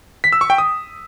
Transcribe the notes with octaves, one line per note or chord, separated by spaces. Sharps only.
B6
E6
C#6
G5
D#6